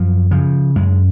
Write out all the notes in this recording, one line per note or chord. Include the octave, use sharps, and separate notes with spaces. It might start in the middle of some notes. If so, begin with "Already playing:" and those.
Already playing: F#2 F3
C#3 F3
F#2 G#3